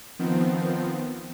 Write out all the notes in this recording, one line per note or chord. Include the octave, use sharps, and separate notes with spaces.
D#3 F3 B3 C4